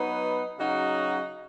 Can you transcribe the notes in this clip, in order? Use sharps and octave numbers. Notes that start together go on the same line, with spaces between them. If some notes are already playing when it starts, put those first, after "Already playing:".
Already playing: F#3 B3 D#4 B4
C#3 F#3 D#4 F#4